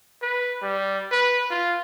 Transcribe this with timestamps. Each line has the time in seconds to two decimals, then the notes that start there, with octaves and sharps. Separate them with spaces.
0.22 B4
0.62 G3
1.11 B4
1.51 F4